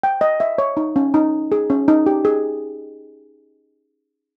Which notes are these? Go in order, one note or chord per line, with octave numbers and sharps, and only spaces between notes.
G5
D#5
E5
C#5
D#4
C#4
D#4
G#4
C#4
D#4
G4
G#4